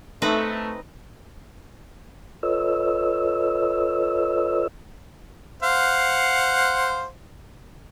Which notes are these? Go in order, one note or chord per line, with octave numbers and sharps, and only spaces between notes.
A3 C4 D#4 B4
F4 A4 B4 C#5 D#5 E6
C5 F5 F#5